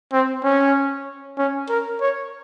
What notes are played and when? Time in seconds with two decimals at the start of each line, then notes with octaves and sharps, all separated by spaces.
0.13 C4
0.44 C#4
1.38 C#4
1.70 A#4
2.01 C#5